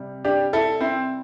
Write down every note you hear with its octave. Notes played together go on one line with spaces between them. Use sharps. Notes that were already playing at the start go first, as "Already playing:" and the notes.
Already playing: C3 G3
D4 G4
E4 A4
C4 E4